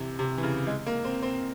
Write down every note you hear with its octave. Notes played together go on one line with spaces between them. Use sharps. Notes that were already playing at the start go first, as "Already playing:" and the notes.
Already playing: C3 E3
C3
E3
C#3
G#3
A#3
C4
C4